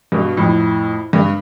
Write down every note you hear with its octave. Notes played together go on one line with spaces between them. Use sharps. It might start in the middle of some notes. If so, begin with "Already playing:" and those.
G2 B2
F2 A2
G2